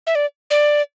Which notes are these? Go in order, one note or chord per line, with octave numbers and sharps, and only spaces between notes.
E5
D5
D5